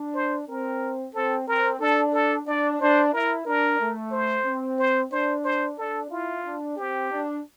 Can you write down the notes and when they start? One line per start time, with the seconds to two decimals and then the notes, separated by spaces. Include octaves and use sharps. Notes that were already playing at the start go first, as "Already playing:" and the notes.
Already playing: D4
0.14 C5
0.48 C4 A#4
1.14 C4 A4
1.48 C4 A#4
1.80 D4 A4
2.13 A4
2.46 D4 D5
2.80 D4 C5
3.13 E4 A#4
3.45 D4 A#4
3.79 A3
4.12 C5
4.45 C4
4.79 C5
5.12 D4 C5
5.44 C5
5.78 D4 A4
6.10 E4 F4
6.44 D4
6.77 C4 G4
7.10 D4